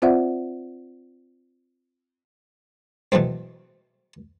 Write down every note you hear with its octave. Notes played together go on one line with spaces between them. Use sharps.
C4 F4 C5 D5 E5 F#5
B2 E3 F#3 A3 C4